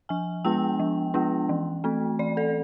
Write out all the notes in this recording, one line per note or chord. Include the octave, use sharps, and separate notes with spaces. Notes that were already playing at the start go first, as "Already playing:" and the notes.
F3 G#5
G#3 B3 D4 G5
F3
G#3 B3 D4
E3
A3 C4
E3 D5
A4